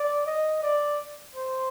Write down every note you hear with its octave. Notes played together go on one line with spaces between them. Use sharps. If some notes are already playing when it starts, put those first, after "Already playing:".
Already playing: D5
D#5
D5
C5